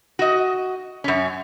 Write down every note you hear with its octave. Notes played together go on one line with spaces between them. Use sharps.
F#4 D#5
F#2 C#4